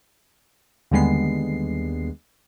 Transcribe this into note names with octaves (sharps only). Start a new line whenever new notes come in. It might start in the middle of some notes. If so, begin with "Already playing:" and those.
D#2 D3 G3 G#3 B3 C7